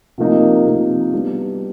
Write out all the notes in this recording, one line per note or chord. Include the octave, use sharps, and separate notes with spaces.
C3 F3 A#3 D#4
C3 F3 A#3 D#4
G3 B3 D4 F#4